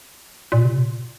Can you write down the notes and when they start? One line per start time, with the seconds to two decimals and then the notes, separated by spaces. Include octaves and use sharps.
0.52 A#2
0.65 C3
0.77 A#2